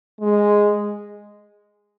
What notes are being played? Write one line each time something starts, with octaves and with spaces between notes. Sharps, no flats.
G#3